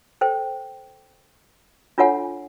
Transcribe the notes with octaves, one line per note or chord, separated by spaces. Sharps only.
A4 C5 G5
D4 F4 A4 C#5 F#5 G#5